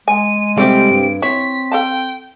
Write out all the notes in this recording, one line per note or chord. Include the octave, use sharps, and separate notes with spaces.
G#3 G#5 D#7
G3 A3 C4 G4 D5 D7
G2
C4 E4 C#5 B6
A4 F5 G5 A5